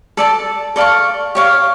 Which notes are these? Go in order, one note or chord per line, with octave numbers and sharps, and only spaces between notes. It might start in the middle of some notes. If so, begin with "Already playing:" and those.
A4 D5 A5
A4 D5 F5 C#6
G4 C#5 F5